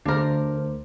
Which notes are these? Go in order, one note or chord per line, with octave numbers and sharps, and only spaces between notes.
D2 D4 A#4 C5